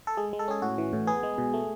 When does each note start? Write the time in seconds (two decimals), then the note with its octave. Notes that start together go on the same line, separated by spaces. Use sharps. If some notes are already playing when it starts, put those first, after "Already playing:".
0.07 A4
0.17 G#3 G#4
0.33 G#3
0.39 A4
0.48 C#4 G#4
0.62 A2 F#4
0.78 E3
0.93 A2
1.07 B3 G#4
1.23 G#3
1.38 B2
1.53 A3